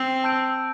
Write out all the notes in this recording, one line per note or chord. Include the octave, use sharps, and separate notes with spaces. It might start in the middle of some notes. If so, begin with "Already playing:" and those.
Already playing: C4
A5 E6 G6 D7